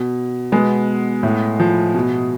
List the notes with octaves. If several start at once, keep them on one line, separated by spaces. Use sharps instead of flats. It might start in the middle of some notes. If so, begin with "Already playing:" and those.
Already playing: B2
B2 G#3 B3
A2
F3
B2